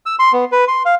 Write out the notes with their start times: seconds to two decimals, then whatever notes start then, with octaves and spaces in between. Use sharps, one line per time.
0.06 E6
0.19 C6
0.33 B3
0.52 B4
0.68 C6
0.85 F5